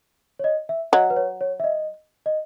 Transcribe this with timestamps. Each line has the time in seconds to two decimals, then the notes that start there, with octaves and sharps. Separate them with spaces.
0.39 C#5
0.44 D#5
0.69 E5
0.92 F#3 D#5
1.10 B4
1.17 C#5
1.41 C#5
1.60 E5
1.64 D#5
2.26 D#5